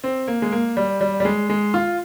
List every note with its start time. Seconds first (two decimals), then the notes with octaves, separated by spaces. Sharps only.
0.04 C4
0.28 A#3
0.42 G#3
0.52 A#3
0.77 G3
1.01 G3
1.20 G3
1.25 G#3
1.50 G#3
1.74 F4